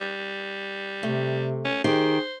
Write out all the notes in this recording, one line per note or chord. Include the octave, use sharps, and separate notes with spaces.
G3
C3 A3
C#4
D#3 D#4 G4 G#4 C5